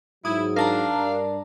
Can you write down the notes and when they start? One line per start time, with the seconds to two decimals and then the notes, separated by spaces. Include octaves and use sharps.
0.25 G#2 F#3 E4 D#6
0.56 D4 A#4 F5 A5 A#5
0.95 G2 D5